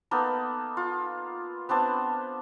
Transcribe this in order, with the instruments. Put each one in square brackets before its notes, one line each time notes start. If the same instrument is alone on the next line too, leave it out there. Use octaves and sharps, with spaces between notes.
[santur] A#3 B3 D#4 A4
F4
B3 C4 D4 A5